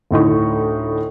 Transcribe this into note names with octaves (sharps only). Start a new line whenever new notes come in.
D2 A2 D#4 C#6